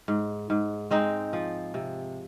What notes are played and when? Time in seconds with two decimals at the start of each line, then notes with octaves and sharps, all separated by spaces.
0.08 G#2
0.50 G#2
0.91 G#3 C4 D#4
1.33 F3
1.74 C3